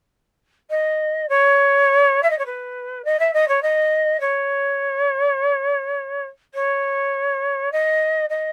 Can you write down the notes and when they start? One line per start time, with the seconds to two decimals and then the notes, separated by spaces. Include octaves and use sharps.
0.70 D#5
1.29 C#5
2.22 E5
2.30 D#5
2.38 C#5
2.45 B4
3.04 D#5
3.19 E5
3.33 D#5
3.48 C#5
3.62 D#5
4.20 C#5
6.54 C#5
7.72 D#5
8.29 D#5